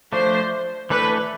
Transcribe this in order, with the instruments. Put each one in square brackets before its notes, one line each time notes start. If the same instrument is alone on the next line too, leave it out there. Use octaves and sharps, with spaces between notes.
[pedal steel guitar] F3 A3 D4 [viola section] C5
[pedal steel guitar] E3 A3 D4 A4 [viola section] B4